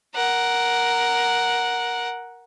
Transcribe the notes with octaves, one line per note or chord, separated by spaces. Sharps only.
A#4 F#5